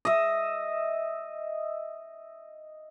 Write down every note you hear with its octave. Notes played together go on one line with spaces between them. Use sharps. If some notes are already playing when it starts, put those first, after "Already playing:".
D#5 E5